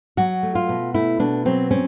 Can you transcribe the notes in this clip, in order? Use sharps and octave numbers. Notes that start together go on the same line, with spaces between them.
F#3 F#4
A3
F4
B2
A3 E4
B2 D4
F#3 C4
C4 C#4